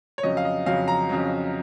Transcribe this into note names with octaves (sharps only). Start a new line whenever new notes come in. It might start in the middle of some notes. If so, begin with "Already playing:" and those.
C#5
F2 C#3 F#3 C#4 D#5
F5
D#5
F2 C#3 F#3 C#4 F5
A#5
F2 C#3 F#3 C#4